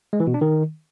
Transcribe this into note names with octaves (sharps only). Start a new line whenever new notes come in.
G#3
E3
B2
D4
D#3